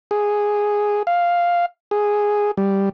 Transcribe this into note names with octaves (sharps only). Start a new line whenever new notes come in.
G#4
F5
G#4
G3